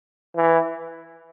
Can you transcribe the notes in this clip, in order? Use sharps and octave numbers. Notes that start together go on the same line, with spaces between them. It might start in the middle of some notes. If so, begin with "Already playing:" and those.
E3